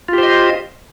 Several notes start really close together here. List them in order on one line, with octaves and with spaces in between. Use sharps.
F4 G4 C5 D#5